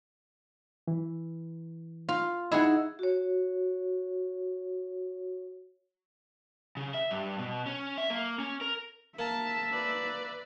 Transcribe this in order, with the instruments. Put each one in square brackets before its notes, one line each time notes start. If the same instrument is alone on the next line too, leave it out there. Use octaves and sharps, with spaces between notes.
[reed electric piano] E3
[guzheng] F4
[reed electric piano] D#4 D#5 [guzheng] E4 G#4 F#5
[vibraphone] F#4 C#5
[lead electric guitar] C#3
E5
G2
B2
C#4
E5
A#3
C#4
A#4
[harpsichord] A#3 [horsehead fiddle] E5 [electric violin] A5
[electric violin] B4 D5